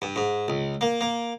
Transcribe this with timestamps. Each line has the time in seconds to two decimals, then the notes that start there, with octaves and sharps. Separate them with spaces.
0.02 G2
0.16 G#2
0.48 C#2
0.81 A#3
1.01 A#3